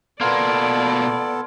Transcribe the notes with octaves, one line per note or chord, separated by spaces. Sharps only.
B2 A#3 B3 A4 D5 C6 F6 G#6